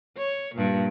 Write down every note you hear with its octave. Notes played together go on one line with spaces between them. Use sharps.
C#5
G2 A#2